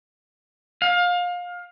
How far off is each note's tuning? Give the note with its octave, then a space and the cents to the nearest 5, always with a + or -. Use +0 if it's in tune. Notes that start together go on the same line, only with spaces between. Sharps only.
F5 +25